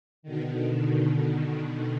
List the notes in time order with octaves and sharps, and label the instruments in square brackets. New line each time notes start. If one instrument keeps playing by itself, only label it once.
[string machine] B2 D3 D#3